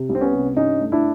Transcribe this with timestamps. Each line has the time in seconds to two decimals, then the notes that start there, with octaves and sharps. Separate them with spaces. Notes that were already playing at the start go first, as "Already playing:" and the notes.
Already playing: C3
0.09 C2
0.15 C4
0.21 B3 C#4
0.33 C3
0.57 G2 C#4 D#4
0.80 A3
0.92 D4 E4